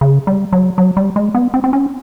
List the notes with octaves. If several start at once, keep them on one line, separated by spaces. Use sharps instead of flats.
C#3
G3
F#3
F#3
G3
G#3
B3
C4
C4
C#4